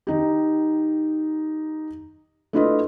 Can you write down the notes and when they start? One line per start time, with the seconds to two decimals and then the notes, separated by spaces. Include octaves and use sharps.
0.07 D#3 D#4 G4
2.53 A3 D4 E4 F4 B4 D#5